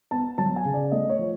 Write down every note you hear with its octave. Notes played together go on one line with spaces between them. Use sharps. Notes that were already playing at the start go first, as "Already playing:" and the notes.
B3 A5
F#3 A5
G#5
C#3
D5
A3 D#5
C#5
F3